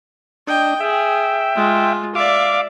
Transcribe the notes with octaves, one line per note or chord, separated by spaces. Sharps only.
D4 D#5 G5
G#4 E5 G5
G#3 F4
D5 E5 F5 D6